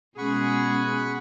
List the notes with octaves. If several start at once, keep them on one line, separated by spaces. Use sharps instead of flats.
B2 G#3 C#4 G#4 F#5 B5 C#6